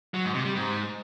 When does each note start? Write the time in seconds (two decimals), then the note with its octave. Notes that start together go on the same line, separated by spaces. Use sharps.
0.14 F#3
0.24 G#2
0.35 C3
0.45 G3
0.55 G#2